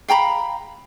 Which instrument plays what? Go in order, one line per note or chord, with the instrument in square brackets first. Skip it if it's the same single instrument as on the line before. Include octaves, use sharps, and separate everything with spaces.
[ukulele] F5 G5 A#5 B5